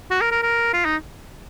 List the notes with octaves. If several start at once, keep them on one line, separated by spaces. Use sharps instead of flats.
F#4
A#4
A#4
A#4
F4
D#4